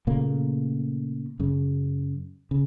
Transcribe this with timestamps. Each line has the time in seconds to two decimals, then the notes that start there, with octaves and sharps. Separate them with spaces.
0.07 A#2 C#3 A3 A#3
1.40 F#2 C#3
2.51 C#3